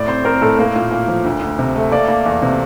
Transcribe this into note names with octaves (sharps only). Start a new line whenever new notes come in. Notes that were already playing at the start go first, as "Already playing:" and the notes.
Already playing: A2 D5
C4 C5
C4 A#4
A2 A4
A#3 A#4
A#2
A#3
F3
D2
D2
C3
A3
A#3 D5
A#3
E2
C3